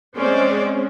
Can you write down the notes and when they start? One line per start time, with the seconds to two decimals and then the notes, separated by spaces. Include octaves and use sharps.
0.15 G#3 C4 C#4 C5 D5